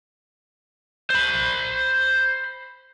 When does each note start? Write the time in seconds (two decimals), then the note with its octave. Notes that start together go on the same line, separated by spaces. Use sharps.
1.10 C5 B5